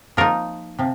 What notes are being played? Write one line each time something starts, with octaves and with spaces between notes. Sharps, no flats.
F3 A#3 D#4 F4 A#4
C3 F3